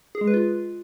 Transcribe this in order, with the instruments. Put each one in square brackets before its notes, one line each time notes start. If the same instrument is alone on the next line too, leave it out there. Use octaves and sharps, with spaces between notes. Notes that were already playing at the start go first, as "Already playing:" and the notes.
[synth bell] G#4
G#3
B4
F4